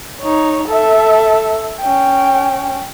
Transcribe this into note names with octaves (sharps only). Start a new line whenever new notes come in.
D#4 C#5
A4 E5
C#4 G5